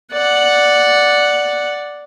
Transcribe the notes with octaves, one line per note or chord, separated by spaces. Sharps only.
D5 F#5